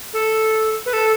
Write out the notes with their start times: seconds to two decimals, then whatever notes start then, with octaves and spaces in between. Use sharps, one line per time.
0.13 A4
0.86 B4
0.93 A4